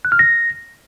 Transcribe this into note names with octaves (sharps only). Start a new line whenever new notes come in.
F#6
F6
A#6